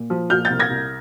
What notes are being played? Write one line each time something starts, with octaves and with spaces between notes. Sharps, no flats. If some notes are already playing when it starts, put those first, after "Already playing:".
Already playing: A#2
F3
A#2 F6 G6
G6 A6
C2
G#6 A#6
C2